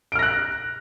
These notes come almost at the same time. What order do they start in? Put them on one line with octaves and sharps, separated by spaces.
D7 F6 A#6 F#6